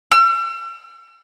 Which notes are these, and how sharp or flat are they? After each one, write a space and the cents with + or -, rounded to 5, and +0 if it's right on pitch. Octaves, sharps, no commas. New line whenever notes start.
E6 +45